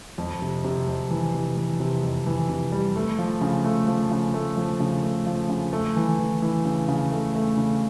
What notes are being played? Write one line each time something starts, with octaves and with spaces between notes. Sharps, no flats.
F2
C3
C3
F2
E3
C3
E3
C3
F2
E3
C3
G3
A3
F3
C#3
A3
F3
C#3
A3
F3
C#3
A3
F3
C#3
A3
E3
E3
E3
C#3
C#3
A3
A3
C#3